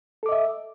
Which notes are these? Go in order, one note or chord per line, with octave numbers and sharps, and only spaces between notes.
A4 D#5 E5 D6